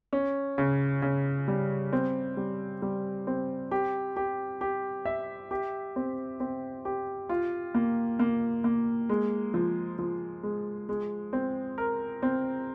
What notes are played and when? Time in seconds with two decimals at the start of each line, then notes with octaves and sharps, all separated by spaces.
0.13 C#4
0.58 C#3
1.02 C#3
1.48 G3
1.93 C4
2.37 G3
2.82 G3
3.27 C4
3.71 G4
4.16 G4
4.61 G4
5.05 E5
5.51 G4
5.96 C4
6.40 C4
6.85 G4
7.29 F4
7.75 A#3
8.19 A#3
8.64 A#3
9.09 G#3
9.54 F3
9.99 F3
10.43 G#3
10.89 G#3
11.33 C4
11.78 A#4
12.22 C4